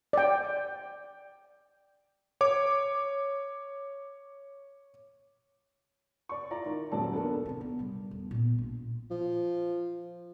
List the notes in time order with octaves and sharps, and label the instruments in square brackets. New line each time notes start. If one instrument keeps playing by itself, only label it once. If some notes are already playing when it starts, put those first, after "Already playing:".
[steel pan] D5 G5
[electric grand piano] C#5 D6
[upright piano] D5 C#6
E4 F4 D5 A#5
D#3
D#1 F#2 F#3 D5 A5
B3 D4 A4 A#4
[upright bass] C#3 C4
B3
C3 G3
E1
A#2 B3
A#1 F4
[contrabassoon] F3